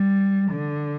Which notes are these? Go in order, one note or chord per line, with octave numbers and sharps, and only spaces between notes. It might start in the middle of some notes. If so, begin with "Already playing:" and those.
Already playing: G3
D3